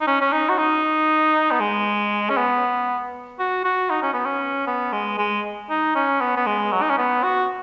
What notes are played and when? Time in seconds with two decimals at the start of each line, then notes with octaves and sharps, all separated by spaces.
0.01 D#4
0.07 C#4
0.21 C#4
0.33 D#4
0.49 F#4
0.58 D#4
1.51 B3
1.60 G#3
2.29 C#4
2.37 B3
3.39 F#4
3.64 F#4
3.90 D#4
4.02 C#4
4.14 B3
4.26 C#4
4.67 B3
4.93 G#3
5.18 G#3
5.70 D#4
5.95 C#4
6.21 B3
6.37 B3
6.47 G#3
6.72 F#3
6.82 D#4
6.90 C#4
6.97 B3
7.23 F#4